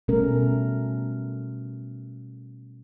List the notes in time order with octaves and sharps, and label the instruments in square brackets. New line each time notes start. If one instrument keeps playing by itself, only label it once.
[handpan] B2 G3 A3 C#4 A#4